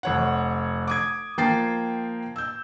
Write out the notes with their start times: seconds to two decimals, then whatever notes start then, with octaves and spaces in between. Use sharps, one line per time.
0.03 F1 C#5 F#5
0.88 D6 D#6 G#6
1.38 F3 A#3 G5 A6 C7
2.36 E6 G6